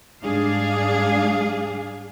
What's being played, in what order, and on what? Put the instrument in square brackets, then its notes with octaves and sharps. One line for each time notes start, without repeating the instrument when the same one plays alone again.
[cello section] G#2 G3 D4 G#4 F5